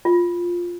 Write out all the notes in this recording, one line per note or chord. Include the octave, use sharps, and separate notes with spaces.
F4